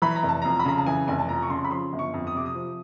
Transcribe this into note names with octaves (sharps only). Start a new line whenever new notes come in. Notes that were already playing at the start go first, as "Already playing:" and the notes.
E3 B5
A#5
F1
A5
F2 A#5
B5
C#3 A#5
A5
E3 G#5
F1 G#5
A5
F2 A#5
C#6
C#3 C6
B5
F3 C6
G1
C#6
F2
D#6
C3 D6
D#6
F3